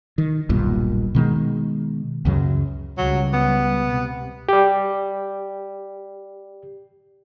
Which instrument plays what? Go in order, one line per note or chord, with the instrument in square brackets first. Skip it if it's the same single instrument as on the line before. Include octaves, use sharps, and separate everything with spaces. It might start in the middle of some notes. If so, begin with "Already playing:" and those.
[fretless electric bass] D#3
D#1 B1 G2 A#2
B2 D#3 G#3
C#2 F#2 C#3 F#3
[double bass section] C#2 G3 [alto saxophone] F#3
[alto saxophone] B3
[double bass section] C3
[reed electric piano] G4 D5